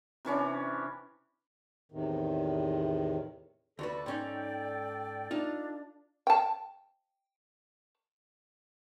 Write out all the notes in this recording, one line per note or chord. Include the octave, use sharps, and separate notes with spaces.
C3 E3 C#4 D4
E2 A2 C3 D#3
D2 F#4 A4 B4 D5
G#2 C#4 D#4 G5
D4 D#4 F4 E5
G5 A5